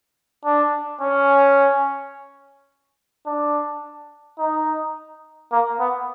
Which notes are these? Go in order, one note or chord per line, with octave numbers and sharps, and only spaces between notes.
D4
C#4
D4
D#4
A#3
B3